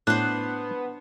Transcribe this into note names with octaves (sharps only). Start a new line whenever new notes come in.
A2 B3 D4 C5 F#6